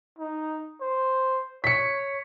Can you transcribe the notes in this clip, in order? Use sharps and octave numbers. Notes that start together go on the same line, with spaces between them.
D#4
C5
C#5 B6 C#7